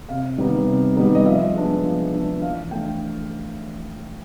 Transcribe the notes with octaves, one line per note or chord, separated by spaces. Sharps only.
C3 F5
D#3 G3 B3 D#4
C3
D#3 G3 B3 D#4
D#5
F3 E5
G#3 B3 D4
F3
G#3 B3 D4
E3 F5
A3 D4 G5